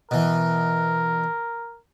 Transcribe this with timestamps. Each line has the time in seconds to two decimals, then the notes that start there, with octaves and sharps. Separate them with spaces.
0.11 B2 E3 A#4